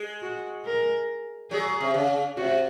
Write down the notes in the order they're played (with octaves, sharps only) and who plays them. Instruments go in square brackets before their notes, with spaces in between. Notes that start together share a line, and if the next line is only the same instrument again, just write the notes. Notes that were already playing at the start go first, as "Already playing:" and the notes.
Already playing: [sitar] G#3
[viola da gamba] F#4
A#4
[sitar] F#3 [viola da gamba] G#4
[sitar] C3
C#3
[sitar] C3 [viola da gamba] F#4